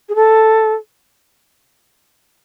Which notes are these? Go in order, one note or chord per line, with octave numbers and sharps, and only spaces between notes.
G#4
A4